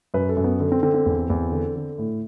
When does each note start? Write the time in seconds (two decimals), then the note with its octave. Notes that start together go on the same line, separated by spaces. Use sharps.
0.14 F#2 B4
0.29 A4
0.37 F#2
0.44 B3
0.60 D3
0.72 C4
0.83 D3 C4
0.94 C4
1.06 E2
1.30 E2
1.52 D3
1.76 D3
1.98 A2